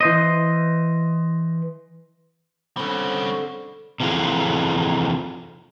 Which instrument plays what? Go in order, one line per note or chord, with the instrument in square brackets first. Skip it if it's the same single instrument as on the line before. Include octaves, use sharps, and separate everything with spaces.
[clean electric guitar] E3 C5 D#5
[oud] D3 C4 [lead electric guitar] G3 C#4
[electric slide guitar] C3 E3 F3 F4 G#4 A4